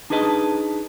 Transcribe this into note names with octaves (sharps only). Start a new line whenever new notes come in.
D4 D#4 G#4 B4 D#5 A5